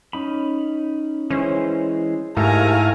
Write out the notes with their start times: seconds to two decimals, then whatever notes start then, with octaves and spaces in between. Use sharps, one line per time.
0.13 C#4 D#4 B5
1.30 E3 G#3 C#4 C5
2.37 G#2 A3 E4 G4 A#4 F5 G#5 A#5